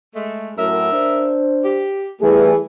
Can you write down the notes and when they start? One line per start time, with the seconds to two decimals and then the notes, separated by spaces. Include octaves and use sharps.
0.14 G#3 A3
0.58 F#2 A2 A#4 E5
0.92 D4 C5
1.64 G4
2.21 E2 E3 G3 A3 G#4 B4